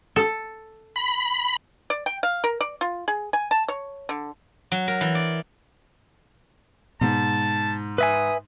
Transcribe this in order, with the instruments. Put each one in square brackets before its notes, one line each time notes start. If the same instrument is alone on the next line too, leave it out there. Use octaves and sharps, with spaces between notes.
[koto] A4
[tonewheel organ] B5
[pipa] D5
G5
F5
A#4
D5
F4
G#4
G#5
A5
C#5
D3
[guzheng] F#3
A#4
E3
D5
[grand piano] G#2 [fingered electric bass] B2 G#3 B3 [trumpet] A5
[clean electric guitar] B4 E5 G#5 [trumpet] D#6